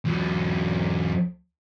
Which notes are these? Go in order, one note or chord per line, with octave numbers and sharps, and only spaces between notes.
E2 F#3